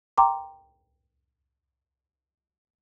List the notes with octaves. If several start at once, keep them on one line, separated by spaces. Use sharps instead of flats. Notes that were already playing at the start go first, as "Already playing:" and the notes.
G5 A#5 C6 D6